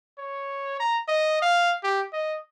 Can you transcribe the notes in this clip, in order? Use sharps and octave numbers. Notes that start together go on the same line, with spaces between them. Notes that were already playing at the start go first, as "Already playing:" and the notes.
C#5
A#5
D#5
F5
G4
D#5